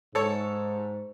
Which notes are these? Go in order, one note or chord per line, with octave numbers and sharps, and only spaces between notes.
G#2 A4 C#5